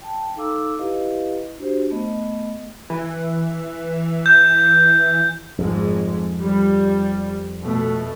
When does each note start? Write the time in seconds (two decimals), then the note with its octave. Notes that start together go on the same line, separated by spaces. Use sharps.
0.01 G5 A5
0.36 D#4 A4 F5 A#5 D6 E6
0.78 E4 G4 B4 D#5 F5
1.58 D4 F#4 G4 C5
1.90 A3 B3 D#5
2.90 E3
4.26 G6
5.58 G#1 F2 G#2 F3 G#3
6.42 G3
7.64 B2 A3